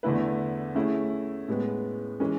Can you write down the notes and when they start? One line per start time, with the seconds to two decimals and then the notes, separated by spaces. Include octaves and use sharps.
0.03 E2 D3 A3 E4 B4
0.75 A3 C#4 E4 G#4
1.48 A2 G#3 B3
2.20 E3 G#3 C#4